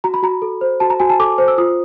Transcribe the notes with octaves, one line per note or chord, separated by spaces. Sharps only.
F#4 A#5
B5
F#4 A#5
A4
C5
F#4 A5
A#5
F#4 G#5
A5
A4 D6
C5
E6
F4 D#6